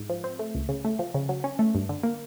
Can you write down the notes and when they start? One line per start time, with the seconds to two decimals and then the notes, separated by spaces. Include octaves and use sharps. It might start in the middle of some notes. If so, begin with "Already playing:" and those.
Already playing: G#2
0.09 F3
0.24 C4
0.39 A3
0.55 C#2
0.69 C#3
0.85 A3
0.99 F3
1.14 C#3
1.29 F#3
1.44 C#4
1.59 A3
1.75 G2
1.89 D3
2.03 A#3